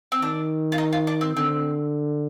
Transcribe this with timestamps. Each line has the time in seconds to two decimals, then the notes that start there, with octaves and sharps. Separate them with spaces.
0.12 C4
0.22 D#3 D4
0.72 F4
0.78 D#4
0.92 F4
1.07 D4
1.21 C4
1.35 D3 C4